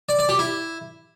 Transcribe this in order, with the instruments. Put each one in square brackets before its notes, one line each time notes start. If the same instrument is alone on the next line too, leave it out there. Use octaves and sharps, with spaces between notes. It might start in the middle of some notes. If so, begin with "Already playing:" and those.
[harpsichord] D5
D5
G4
E4